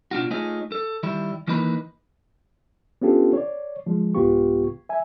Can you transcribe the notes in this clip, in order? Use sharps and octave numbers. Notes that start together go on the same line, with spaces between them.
B2 D4 F4 F#4
A3 D#4 F4 G#4 C#5 D#5
A4
D#3 G3 E4
D#3 E3 A#3 D#4 B4 B5
B3 C#4 D4 F4 G4 A4
C#5 D5
F3 G#3
C2 G#2 B3 F4 G4 C#6
E5 G#5